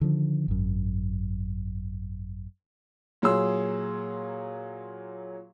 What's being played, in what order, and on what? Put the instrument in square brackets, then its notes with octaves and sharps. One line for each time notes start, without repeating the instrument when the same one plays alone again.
[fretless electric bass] D3 D#3 F3
G#1 F#2
[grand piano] A#2 F#3 G#4 C6 E6